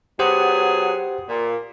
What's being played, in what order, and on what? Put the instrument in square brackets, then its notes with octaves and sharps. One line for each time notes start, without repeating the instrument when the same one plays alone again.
[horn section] F#3 B3 G#4 [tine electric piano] G4 C5 F#5
[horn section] A#2